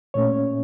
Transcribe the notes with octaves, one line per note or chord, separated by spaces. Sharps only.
A#2 A3 C#4 C#5